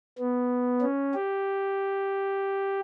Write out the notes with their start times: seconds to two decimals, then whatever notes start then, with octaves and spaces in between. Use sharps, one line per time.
0.18 B3
0.81 C#4
1.14 G4